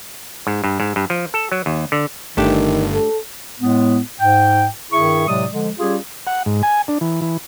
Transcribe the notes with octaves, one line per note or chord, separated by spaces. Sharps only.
G#2
G2
G#2
G2
F3
A4
F#3
D#2
D3
G1 D#3 A3 D4 G4
A4
A2 G#3 B3
G#2 G5
G2 D#3 E4 G#4 E5 C#6
A2 C3 F#3 G#3 D5 D#6
D3 F3 G#3
G3 C#4 F4 G4 G#4
F#5
G#2
G#5
D4
E3
E3